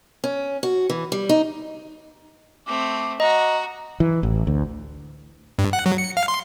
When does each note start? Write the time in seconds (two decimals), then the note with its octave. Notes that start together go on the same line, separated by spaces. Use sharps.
0.24 C#4
0.63 F#4
0.90 E3
1.12 G3
1.29 D#4
2.67 A3 C4 D6
3.20 F#4 D#5 A#5
4.00 E3
4.23 A1
4.47 D2
5.59 G2
5.73 F#5
5.86 F#3
5.98 C#7
6.17 F5
6.28 C6